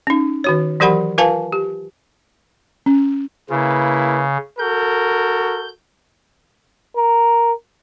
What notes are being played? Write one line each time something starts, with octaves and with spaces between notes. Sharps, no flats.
C#4 D#4
D#3 F#4 C#5
E3 F#3 G4 A#4 F#5 B5
F4 A#4 B4 F5 G#5 A5
G4
C#4
C#3 A#3 E4 B4
F#4 A4 A#4 G6
A#4